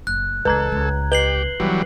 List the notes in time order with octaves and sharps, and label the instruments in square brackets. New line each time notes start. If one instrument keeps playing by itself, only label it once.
[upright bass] F#1 [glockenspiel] F#6
[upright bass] C#2 E3 [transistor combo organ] A4 [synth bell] B4 A#5 G#6
[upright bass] C#2
[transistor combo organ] G4 [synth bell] B4 [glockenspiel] C7 F#7 G7
[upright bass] D#3 B3 [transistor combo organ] E3 F#3 G3